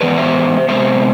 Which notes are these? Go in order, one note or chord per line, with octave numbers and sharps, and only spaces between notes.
G#2 E3 B3 B4 D5
C5 E5
C3 G#3 B3 C5 E5